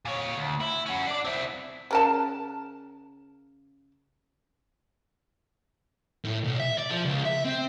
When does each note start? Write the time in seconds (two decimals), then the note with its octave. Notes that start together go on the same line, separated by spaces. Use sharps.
0.05 A#2 C#5
0.36 D2
0.61 E4
0.86 C#4 F#4
1.07 D4 D5
1.25 C4 E4
1.91 C#3 A#4 A5
6.24 A2
6.44 B1
6.60 E5
6.78 D5
6.90 F3
7.05 C#2
7.25 E5
7.45 C4